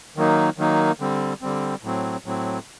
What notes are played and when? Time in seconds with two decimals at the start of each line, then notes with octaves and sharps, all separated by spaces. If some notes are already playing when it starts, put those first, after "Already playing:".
0.17 D#3 F#3 A#3 D#4
0.58 D#3 F#3 A#3 D#4
1.00 D3 G3 C4
1.42 D3 G3 C4
1.83 A2 F#3 C4
2.26 A2 F#3 C4